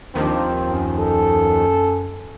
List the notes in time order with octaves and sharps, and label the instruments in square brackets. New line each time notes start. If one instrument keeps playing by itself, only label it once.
[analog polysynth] D#2 D#3 F3 [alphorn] C4 [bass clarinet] D4
[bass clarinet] F#2
[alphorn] A4